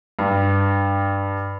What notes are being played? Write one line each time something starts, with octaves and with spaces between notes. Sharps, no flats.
G2